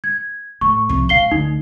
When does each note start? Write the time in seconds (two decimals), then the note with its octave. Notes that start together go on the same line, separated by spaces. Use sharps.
0.04 G#6
0.61 A2 C#6
0.89 C2 F3
1.09 G#2 F5 C7 G7
1.31 D2 D#4